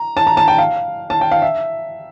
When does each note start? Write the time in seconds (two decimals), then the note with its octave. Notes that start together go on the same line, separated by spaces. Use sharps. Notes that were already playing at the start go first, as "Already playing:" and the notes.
Already playing: A#5
0.17 A5
0.27 A#5
0.37 A5
0.48 G5
0.58 F5
1.10 A5
1.21 G5
1.31 F5
1.42 E5